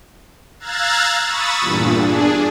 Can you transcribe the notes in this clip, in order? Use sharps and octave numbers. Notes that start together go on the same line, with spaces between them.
F5 A#5 E6 F#6 G#6 A6
B5 C#6 D#6 E6 A6
E2 G2 A#2
D4 G#4